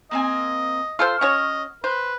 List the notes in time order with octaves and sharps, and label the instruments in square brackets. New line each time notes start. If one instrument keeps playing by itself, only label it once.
[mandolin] A#3 C4 G#5 [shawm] D#5
[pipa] F4 A4 C5 [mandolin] E6 F6
[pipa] C#4 F#4 C#5 [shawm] D#5
[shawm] B4 [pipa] C5